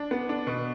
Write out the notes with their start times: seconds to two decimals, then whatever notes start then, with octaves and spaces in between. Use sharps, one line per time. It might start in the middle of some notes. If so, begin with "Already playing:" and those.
Already playing: D4
0.11 B3
0.29 D4
0.47 B2